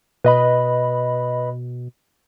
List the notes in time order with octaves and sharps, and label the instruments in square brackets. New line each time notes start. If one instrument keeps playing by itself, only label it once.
[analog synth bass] B2 [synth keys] B4 D#5 B5